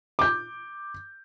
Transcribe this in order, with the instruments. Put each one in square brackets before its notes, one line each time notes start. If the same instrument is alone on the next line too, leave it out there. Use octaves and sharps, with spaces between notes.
[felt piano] D6 G6